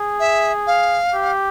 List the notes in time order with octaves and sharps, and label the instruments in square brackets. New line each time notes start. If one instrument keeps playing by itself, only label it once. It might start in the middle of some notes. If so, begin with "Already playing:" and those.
Already playing: [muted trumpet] G#4
[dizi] E5
F5
[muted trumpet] G4